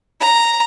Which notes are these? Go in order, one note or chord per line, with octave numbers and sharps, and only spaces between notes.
A#5